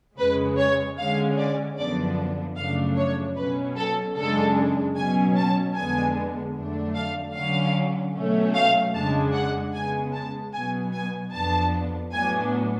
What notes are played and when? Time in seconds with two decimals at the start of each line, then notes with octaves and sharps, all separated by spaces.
0.18 F2 C#3 G#3 B4
0.58 C#5
0.97 D3 G#3 C#4 F5
1.38 D5
1.78 F#2 D3 F3 B3 D4 D5
2.57 F#2 C#3 F3 A3 D4 F5
2.97 C#5
3.37 B2 F#3 C#4 B4
3.77 A4
4.16 F#2 C#3 G#3 D4 A4
4.96 B2 F#3 C#4 G#5
5.36 A5
5.76 F2 D3 G#3 B3 D4 G#5
6.56 F2 D3 F#3 A3 D4
6.95 F5
7.34 D3 F#3 C#4 F5
8.14 B2 F#3 A3 C#4
8.55 F5
8.94 F2 C#3 G#3 D4 A5
9.34 F#5
9.74 C#3 G#3 B3 G#5
10.14 A5
10.53 B2 F#3 B3 G#5
10.94 G#5
11.33 F2 F3 B3 D4 A5
12.13 A2 F#3 B3 D4 G#5